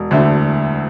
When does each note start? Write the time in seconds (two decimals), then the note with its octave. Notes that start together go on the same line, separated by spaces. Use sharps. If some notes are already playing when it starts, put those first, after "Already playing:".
Already playing: E1
0.11 D2 D3 A3 E4